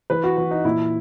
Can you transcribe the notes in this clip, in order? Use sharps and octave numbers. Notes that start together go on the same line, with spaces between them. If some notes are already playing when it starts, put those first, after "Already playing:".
E3 B4
F#4
E3 F#4
D#4
A#2 E4